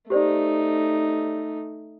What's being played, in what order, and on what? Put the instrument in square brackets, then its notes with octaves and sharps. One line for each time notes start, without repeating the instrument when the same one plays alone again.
[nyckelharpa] A3 D#4 [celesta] G4 C5 D5